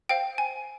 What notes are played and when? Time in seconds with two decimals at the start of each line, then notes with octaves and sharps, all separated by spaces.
0.09 C5 F5 G5
0.38 G#5